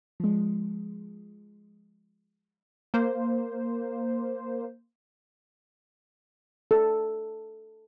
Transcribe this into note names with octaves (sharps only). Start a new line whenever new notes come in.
F3 G#3
A#3 C5
A4